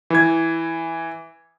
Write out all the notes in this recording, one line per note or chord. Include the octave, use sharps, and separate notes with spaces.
E3 G#6